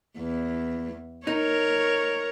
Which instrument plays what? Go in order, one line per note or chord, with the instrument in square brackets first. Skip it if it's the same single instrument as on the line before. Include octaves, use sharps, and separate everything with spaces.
[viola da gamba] E2
[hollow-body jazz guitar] D#4 [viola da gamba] A#4 C#5